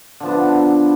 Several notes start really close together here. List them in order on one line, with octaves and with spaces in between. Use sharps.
D3 F3 B3 D4